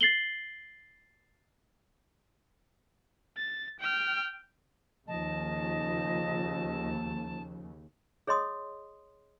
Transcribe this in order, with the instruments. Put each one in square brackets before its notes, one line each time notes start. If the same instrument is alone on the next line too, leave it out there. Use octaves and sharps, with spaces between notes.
[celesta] A6 C7 F#7 G7
[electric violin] A6
G5 F6
[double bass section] D#2 C#3 [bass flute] F3 [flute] D#5 [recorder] A5
[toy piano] G#4 C#5 D#5 C6 D#6